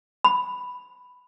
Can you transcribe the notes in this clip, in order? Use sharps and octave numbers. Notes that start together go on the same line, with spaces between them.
B5